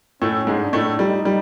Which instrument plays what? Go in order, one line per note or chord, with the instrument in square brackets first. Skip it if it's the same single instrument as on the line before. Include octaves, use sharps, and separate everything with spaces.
[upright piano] A2 A3 [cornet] C#4
[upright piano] G#2 G#3
[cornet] D4
[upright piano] A2 A3
[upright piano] G3 [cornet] D#4
[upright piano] G3